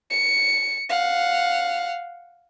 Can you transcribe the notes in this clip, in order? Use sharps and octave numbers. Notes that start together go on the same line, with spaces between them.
C#7
F5 F#5